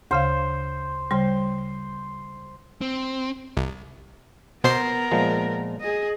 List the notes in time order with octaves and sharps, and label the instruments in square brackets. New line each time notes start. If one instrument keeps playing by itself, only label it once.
[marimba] D2 C#3 F5 [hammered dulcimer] C5
[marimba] C#3 G3 [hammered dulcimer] C5
[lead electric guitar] C4
[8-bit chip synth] C2
[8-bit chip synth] B2 C5 C7 [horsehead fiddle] B3 A#4
[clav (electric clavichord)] A#2 F3 G#3
[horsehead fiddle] G#4 D#5